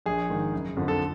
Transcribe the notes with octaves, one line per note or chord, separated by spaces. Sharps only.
A#1 G#4
G#2 D#3
F#1
F2 D3 F3
A4